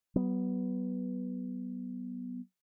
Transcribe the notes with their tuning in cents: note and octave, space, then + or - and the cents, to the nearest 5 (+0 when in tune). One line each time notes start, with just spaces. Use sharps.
F#3 +40 B3 +0